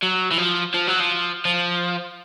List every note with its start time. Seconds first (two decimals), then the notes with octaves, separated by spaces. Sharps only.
0.03 F#3
0.31 E3
0.38 F3
0.74 F3
0.88 F#3
1.00 F3
1.45 F3